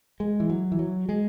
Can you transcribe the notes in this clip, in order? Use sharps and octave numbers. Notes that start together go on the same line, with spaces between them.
G#3
E3
F#3
E3
F#3
G#3